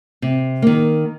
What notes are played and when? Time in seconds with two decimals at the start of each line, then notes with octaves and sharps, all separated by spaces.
0.22 C3
0.62 D#3 A#3